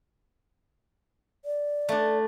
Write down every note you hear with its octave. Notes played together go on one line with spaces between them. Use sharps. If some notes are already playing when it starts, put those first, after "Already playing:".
D5
A3 D4